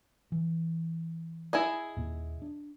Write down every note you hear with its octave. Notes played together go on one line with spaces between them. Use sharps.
E3
E4 G#4 D#5
D#2 A#2
D4